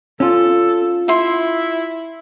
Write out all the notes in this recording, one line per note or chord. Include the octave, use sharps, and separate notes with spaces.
C#4 F4 A4
E4 E5 C6